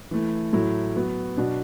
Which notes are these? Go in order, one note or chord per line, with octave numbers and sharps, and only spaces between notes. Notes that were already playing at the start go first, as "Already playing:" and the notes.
E3 A3 E4
A2 F#3 A3 E4
F#3 B3 F#4
B2 F#3 D4 F#4